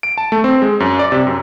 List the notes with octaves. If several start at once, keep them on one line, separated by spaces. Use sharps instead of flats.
D7
A5
A3
C4
G#3
F#2
D5
C3
F#2